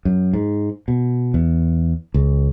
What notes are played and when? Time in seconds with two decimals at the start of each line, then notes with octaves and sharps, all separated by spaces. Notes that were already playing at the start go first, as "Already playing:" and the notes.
0.05 F#2
0.34 G#2
0.88 B2
1.34 E2
2.14 C#2